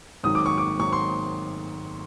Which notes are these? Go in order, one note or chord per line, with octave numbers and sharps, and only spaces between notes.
G#1 G#2 D#3 F#3 D#6
D6
C#6
D6
G#1 G#2 D#3 F#3 C#6
C6